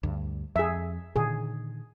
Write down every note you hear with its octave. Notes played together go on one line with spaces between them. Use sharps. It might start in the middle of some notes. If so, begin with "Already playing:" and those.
D2 G2
F2 G#4 E5
A#2 D3 D#3 G#4